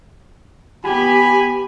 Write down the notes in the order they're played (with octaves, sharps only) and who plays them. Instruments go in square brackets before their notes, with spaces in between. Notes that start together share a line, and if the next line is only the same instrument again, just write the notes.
[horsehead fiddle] B3 G4 [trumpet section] G#5 B5